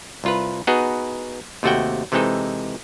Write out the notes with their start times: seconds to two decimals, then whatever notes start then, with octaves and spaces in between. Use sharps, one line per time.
0.24 C2 F4 B4
0.67 B3 D#4 F#4 G#4 B4
1.63 D#2 C3 A3 F#4 F#5 G5
2.12 C3 E3 G#3 C4 D#4 A4